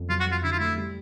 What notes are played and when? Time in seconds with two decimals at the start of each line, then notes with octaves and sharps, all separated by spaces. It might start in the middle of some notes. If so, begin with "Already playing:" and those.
Already playing: F2
0.09 F#3 F4
0.20 F#4
0.26 F2
0.32 F4
0.43 D3 E4
0.52 F4
0.59 A3 E4
0.76 G3